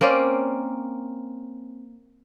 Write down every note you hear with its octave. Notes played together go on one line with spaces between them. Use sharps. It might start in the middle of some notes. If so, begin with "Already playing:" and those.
A#3 C4 C#4 D5